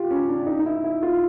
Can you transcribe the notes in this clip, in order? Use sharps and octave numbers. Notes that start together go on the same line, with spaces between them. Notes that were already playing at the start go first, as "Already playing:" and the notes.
Already playing: F4 G4
C#4
D4
D#4
D#4
E4
E4
F4